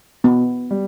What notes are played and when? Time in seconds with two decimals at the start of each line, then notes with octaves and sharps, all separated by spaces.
0.24 B2 B3
0.71 G3